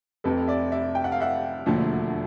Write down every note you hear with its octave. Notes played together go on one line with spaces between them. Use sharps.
F1 F2 C3 A4 B4
D5 E5
D5 E5
G5
F#5
F5
E5 F#5
E1 D#2 D3 F3 A3